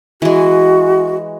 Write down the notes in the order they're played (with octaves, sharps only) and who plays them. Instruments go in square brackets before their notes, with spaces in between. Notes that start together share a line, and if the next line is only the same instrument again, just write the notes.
[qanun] E3 G#3 [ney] F#4